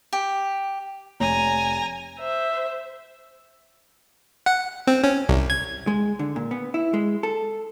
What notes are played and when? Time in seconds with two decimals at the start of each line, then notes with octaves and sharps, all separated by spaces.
0.13 G4
1.20 F1 C#5 G#5 A#5
2.19 C5 E5
4.46 F#5
4.87 C4
5.04 C#4
5.29 C2
5.50 G#6
5.87 G#3
6.19 D3
6.36 A#2
6.51 B3
6.74 E4
6.94 G#3
7.23 A4